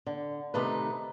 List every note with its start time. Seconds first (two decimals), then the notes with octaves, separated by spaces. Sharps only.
0.06 D3
0.54 C3 D#3 A3 D#4 B4